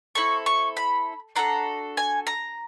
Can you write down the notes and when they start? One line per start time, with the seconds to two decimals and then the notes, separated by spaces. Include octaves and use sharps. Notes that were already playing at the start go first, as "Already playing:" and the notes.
0.15 C4 E4 A4 C#6
0.46 C#6
0.77 B5
1.36 D4 F#4 A4 A#5
1.97 G#5
2.27 A#5